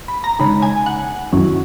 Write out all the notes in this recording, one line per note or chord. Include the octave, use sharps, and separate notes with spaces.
B5
A#5
C#3 G#3 D#4 B5
G#5
F#5
F#2 D#3 F#3 C#4 E4